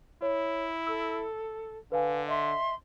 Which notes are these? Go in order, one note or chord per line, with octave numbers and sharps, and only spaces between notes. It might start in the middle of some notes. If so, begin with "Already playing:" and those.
E4 C#5
A4 E6
D3 B4 F5 G#5
D#5 E5 C6